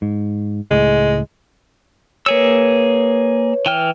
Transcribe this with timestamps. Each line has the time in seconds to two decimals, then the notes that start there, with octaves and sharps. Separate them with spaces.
0.02 G#2
0.71 C#2 A2 G#3
2.26 A#3 G#4 B4 C#5 E6
3.66 E3 G5 F6